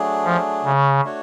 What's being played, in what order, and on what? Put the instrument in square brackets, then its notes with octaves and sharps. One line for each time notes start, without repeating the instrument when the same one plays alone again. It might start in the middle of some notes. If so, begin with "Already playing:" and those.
Already playing: [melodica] F#3 A3 D4 G#4
[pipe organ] F3
C#3
[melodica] A3 D4 F#4 C#5